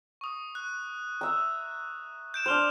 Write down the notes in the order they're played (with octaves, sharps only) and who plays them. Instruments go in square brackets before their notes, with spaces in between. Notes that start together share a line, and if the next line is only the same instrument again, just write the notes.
[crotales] C#6 D#6
F#6
[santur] E5 A#5
[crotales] G6 D7 E7
[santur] D4 C5 [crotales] F6 F7